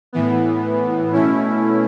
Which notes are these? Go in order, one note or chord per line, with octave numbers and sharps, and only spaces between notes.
A2 E3 B3
B2 A3 C#4 E4